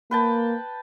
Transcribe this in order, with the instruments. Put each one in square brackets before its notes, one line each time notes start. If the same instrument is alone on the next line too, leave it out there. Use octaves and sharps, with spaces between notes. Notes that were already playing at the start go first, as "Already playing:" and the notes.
[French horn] A#3 [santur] B4 G5 A5